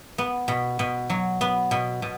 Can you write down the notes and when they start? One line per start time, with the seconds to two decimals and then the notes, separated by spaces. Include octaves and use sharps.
0.18 B3
0.48 B2
0.79 B2
1.10 F#3
1.41 B3
1.71 B2
2.02 B2